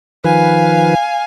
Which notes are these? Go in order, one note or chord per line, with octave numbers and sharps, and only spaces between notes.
D#3 F3 B4 F5 G#5